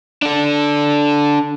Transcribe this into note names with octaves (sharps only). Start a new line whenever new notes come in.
D4 A4